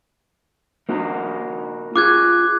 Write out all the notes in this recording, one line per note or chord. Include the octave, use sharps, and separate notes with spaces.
A#3 D#4 F#4
F4 G#4 D6 F#6 G#6